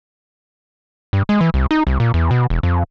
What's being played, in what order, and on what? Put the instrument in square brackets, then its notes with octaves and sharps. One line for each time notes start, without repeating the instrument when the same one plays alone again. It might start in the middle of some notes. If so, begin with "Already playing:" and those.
[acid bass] G2
G#3
E3
C2
D#4
C2
A#2
E2
B2
E1
F2